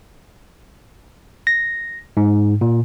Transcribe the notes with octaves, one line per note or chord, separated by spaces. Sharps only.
A#6
G#2
A#2